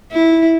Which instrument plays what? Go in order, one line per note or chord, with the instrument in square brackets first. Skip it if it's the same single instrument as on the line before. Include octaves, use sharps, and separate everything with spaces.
[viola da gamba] E4